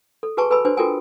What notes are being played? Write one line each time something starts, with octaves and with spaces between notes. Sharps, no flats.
A4
F#4 G#4 B4 G#5 A5 C#6
A4 B4 G#5 A5 B5 E6
D4 F#4 B4 C5 G#5
F4 F#4 A4 A#4 G5 G#5